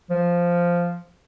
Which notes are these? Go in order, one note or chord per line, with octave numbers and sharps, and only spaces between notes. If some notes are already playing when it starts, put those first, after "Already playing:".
F3